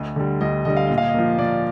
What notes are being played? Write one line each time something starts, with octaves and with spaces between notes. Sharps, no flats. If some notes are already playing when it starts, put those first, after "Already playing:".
Already playing: D2 D#5
D3 G3
D2 D#5
D3 G3 D#5
F5
A#2 D#5
F5
D#5
F3 A#3
A#2 D5